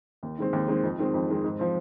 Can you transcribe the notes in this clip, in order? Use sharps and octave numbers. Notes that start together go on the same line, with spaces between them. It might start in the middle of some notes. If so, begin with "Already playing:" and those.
D#2
D#3 G#3 C4
D#2
D#3 G#3 C4
F2
D#3 G#3 C4
F2
D#3 G#3 C4
G#2
F3 C4